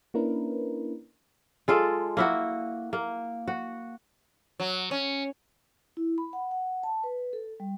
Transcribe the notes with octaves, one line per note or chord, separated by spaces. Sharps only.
A#3 C#4 D4 E4 A#4 B4
G#3 F4 A4 D5
A#3 E4 F#4
A#3
F#4
F#3
C#4
E4
B5
F#5
F#5
A5
B4
A4
G3